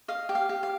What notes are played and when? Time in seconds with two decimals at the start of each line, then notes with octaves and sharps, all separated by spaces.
0.08 D#5 F5
0.29 G4
0.35 F5
0.49 G4
0.63 F5